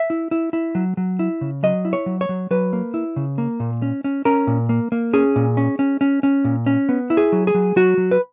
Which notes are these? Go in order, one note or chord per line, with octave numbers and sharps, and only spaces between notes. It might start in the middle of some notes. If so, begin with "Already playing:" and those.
Already playing: E5
E4
E4
E4
F#3
F#3
E4
C#3
F#3 D#5
E4
C#5
F#3
C#5
F#3
F#3 B4
A#3
E4
C#3
A#3
A#2
C#4
C#4
C#4 A#4
A#2
A#3
A#3
C#4 G#4
A#2
C#4
C#4
C#4
C#4
A#2
C#4
B3
E4
G#4
F#3
G#4
F#3
F#3 F#4
F#3
B4